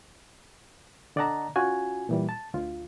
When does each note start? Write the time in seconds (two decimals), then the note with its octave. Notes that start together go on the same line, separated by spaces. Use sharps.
1.16 D3 D5 D#5 F#5 A5 A#5
1.56 C#4 F4 F#4 G#5
2.09 A#2 E3 G3
2.29 A5
2.54 D2 F4